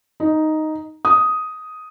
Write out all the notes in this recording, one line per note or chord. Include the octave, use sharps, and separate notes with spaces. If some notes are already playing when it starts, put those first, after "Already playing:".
D#4
D#6